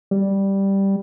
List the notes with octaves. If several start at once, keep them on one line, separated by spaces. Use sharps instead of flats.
G3